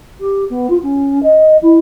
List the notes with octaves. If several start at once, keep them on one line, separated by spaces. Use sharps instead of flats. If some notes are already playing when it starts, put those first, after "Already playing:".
G4
B3
F4
C#4
D#5
E4